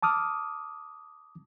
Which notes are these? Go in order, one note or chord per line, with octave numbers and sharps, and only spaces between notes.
A5 D6 D#6 F6